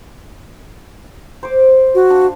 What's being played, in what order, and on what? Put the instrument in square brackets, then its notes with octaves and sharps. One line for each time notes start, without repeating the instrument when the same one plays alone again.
[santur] C5 D6
[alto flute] F#4
[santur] D4 F5